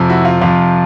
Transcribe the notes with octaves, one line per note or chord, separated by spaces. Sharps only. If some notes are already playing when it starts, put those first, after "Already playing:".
Already playing: F2 C3 F3
E4 F#4
F4
F2 C3 F3 F4